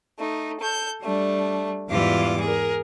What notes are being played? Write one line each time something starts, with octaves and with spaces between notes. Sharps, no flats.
A3 D#4
A4 G6
G3 A3 D4
E2 G#2 E3 G3 F4 D6
G#4 A#4